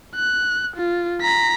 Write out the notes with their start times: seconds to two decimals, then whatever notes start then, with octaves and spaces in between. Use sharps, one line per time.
0.15 F#6
0.76 F4
1.22 A#5 B6